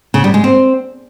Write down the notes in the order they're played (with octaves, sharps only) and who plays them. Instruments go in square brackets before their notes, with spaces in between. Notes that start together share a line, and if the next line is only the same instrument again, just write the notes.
[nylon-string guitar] C#3
G3
G#3
C4